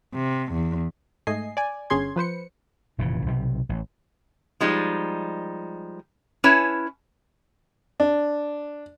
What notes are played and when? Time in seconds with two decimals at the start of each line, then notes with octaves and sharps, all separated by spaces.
0.14 C3
0.53 E2
1.27 G#2 A3 D#5 G#5 C7
1.57 D5 G#5
1.90 G1 D3 C#4 G#4 C6 G#6
2.16 F3 B4 C5 C#7
2.98 F1 A#2 C#3 E3
3.26 B1 C3
3.69 A1
4.61 F3 G3 G#3 D#4
6.44 C#4 E4 B4 C#5 G#5 A5
8.00 D4